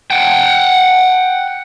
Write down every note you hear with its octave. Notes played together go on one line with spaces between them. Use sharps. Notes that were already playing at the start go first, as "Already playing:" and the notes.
F#5 G5